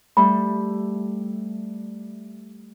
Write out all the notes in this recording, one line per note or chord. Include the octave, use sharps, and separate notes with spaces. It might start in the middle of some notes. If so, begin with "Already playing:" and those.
G3 A3 B5